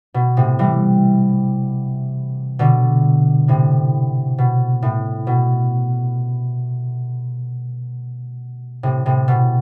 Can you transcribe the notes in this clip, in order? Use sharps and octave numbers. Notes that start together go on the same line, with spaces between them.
B2
A2 C3
E3 G3
B2 D3
A2 C3
B2
A2
B2
A2 C3
A2 C3
B2